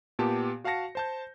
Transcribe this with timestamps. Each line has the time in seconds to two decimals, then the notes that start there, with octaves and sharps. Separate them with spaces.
0.19 A#2 B3 G4 A5
0.64 F#4 F5 F#5 A5 A#6 C#7
0.95 C5 A5 G6